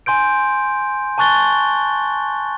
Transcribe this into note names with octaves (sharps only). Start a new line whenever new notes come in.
G#5 C6 G6 D7
G#5 A5 C#6 F#6 A6 G7